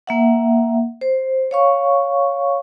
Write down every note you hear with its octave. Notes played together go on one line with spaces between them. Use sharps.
A#3 E5 F#5
C5
C#5 F5 C#6